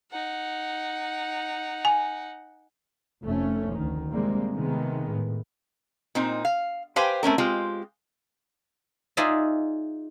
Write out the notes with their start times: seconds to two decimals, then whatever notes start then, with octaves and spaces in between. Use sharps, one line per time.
0.11 D#4 F#5
1.85 G#5
3.23 F1 A3 C#4
3.75 D2 D#3
4.11 C3 G3 G#3 A#3 C4
4.53 C3 D#3 G#3 B3
5.10 A2
6.15 A#2 C4 D#4
6.45 F5
6.96 G4 B4 C5 F5 G5 G#5
7.23 A3 C4 C#4 A#4
7.38 G#3 C4 F4 G4
9.17 D#4 F4 G#4 D5 E5